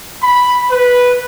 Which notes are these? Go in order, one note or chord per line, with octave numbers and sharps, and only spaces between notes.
B5
B4